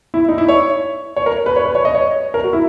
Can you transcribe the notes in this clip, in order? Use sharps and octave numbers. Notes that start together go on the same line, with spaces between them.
E4
D#4
E4
C#5
C#5
A#4
B4
C#5
B4
C#5
D#5
C#5
A#4
F#4
E4